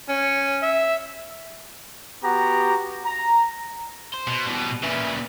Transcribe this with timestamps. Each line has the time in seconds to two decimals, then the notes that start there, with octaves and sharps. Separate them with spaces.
0.09 C#4
0.63 E5
2.24 B3 F#4 G4 A#5
3.05 A#5
4.14 C5
4.27 B2
4.47 B2 E3 G3
4.83 A#2 C#3 B4 E5